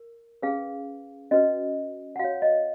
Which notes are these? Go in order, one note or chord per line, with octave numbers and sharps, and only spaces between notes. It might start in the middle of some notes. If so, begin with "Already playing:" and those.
Already playing: A#4
C#4 G#4 B4 F5
C#4 F#4 B4 D#5
F#5
F#4 C#5 F5
D#5